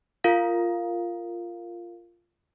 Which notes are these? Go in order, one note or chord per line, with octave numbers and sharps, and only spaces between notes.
F4 A#4 F5